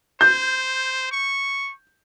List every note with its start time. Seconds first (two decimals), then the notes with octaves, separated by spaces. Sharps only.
0.21 C5 G6
1.12 C#6